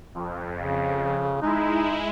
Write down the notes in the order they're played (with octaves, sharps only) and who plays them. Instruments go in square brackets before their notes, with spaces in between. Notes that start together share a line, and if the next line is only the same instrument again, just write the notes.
[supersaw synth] F2
[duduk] C#3
[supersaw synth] G#3 E4 [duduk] D#4